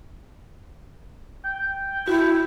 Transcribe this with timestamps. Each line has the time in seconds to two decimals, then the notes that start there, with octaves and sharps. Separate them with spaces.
1.44 G5
2.08 E4 F#4